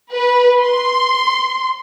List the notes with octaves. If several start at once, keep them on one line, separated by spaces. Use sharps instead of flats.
B4
C6